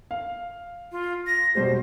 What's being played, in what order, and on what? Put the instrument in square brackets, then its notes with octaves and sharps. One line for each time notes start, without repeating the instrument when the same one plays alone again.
[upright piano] F5
[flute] F4
A#6
[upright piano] B2 G3 G#3 [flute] C5